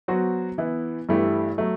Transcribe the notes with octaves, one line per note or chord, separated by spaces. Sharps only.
F#3 B3 F#4 C5
E3 B3 E4
G2 E3 A3 E4 G4
F#3 A3